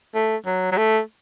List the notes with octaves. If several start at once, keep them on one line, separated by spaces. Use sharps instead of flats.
A3
F#3
F#3
A3